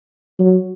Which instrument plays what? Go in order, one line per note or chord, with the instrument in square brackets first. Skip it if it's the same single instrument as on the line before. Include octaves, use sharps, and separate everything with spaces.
[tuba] F#3